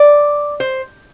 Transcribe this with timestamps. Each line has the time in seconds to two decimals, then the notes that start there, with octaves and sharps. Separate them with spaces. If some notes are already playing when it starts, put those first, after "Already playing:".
Already playing: D5
0.60 C5